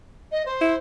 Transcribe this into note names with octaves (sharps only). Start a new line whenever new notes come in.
D#5
C5
E4